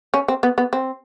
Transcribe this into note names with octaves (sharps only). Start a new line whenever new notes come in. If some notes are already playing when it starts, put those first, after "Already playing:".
C#4
C4
B3
B3
C4